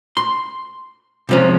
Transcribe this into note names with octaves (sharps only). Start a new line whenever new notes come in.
C6
C3 F3 G#3 C#4